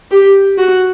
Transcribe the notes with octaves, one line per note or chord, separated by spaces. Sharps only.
G4
F#4